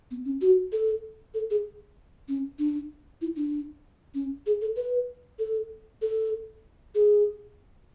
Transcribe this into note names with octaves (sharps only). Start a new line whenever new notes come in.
B3
C#4
F#4
A4
A4
G#4
C#4
D4
E4
D4
C#4
G#4
A4
B4
A4
A4
G#4